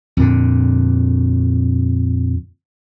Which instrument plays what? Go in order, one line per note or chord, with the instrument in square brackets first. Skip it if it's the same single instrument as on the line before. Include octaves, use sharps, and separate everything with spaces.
[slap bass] F2 A#2 D3